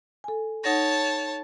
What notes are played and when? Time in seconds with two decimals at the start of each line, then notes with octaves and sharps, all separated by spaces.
0.24 A4 G#5
0.64 D#4 C#5 F#5 A5 A#6